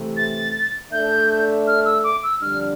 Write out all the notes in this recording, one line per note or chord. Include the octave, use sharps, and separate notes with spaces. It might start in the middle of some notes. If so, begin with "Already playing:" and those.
Already playing: C3 E3 A3
A6
A3 D4 A4 E5 G6
F6
E6
D6
E6
F2 D3 G3 D4 F6